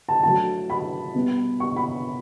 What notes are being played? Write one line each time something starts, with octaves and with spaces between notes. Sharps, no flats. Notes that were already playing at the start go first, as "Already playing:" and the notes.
A5
F#3 A3 D4 A5
B5
B2 G3 B3
C#6
B5